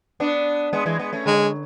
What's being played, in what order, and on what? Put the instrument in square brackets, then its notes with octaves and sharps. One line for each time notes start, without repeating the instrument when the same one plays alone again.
[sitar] B3 D4
G#3 B3
E3 G#3
G#3 B3
A3 C#4
[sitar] D3 [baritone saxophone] G#3